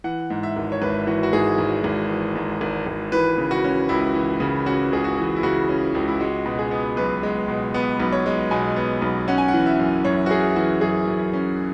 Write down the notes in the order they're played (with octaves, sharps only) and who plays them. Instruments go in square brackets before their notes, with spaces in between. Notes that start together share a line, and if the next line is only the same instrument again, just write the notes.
[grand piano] E3 F#5
G#2
E5
G#1
C#5
G#1 B4
E3 F#4
F#4
G#2 G#4
G#1
G#1
E3
G#2
G#1
G#1
E3 B4
C#3
F#4
C#4
C#2 E4
E3
C#3
C#4 F#4
C#2 G#4
F#4
E3
E4
C#3 F#4
C#4
C#2
E4
G#3 F#4
B2
G#4
B3
B1 B4
G#3
B2
B3 B4
B1
C#5
G#3
B2 G#5
B3
B1
C#4 F#5
G#5
F#5
E3
E5
F#2
F#2 C#5
F#4
C#4 G#4
E3 F#4
F#2 G#4
F#2
C#4